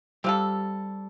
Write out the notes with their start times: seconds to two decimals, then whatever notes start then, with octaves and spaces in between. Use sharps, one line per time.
0.24 G3 C4 F4 A4